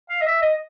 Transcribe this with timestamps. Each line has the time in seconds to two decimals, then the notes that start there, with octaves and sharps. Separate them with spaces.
0.10 F5
0.21 D#5
0.26 E5
0.42 D#5